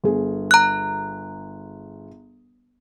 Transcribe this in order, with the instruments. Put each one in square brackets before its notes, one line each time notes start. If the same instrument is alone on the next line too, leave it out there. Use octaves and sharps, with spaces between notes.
[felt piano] G1 G#4
[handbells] A#5 F#6